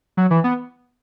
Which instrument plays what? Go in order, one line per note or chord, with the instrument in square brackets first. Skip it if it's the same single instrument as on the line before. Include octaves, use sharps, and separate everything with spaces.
[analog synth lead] F#3
E3
B3